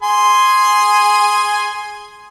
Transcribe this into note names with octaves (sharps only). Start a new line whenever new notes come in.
G#4 G#5 C6